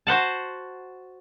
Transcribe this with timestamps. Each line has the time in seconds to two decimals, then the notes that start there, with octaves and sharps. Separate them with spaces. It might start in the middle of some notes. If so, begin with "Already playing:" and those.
0.07 F#4 C5 F#5 A5